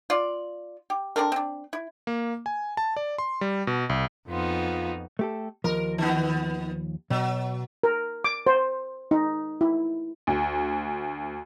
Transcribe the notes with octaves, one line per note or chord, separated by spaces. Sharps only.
F4 D5
G4
C4 D4 A4 A#4
C4 D4
E4
A#3
G#5
A5
D5
C6
G3
B2
C2
F2 B3 D#4 F4
A3 G4 A4
D#2 F3 A#4
D#3 B3
B2 F#3
A#4
D6
C5
D#4
E4
D2